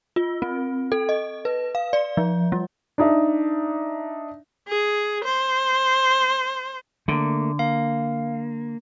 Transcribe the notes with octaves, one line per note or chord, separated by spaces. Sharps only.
F4
C4
A4
D#5
B4
F5
D5
F3
G3
D4 D#4 E5
G#4
C5
D3 A3 A#3
A#3 F5